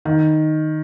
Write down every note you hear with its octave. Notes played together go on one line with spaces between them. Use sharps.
D#3